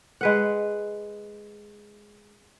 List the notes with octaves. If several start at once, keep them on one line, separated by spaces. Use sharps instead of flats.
G#3 B4 F#5